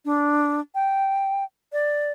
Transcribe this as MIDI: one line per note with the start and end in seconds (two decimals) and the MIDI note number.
0.05 0.60 62
0.75 1.44 79
1.73 2.12 74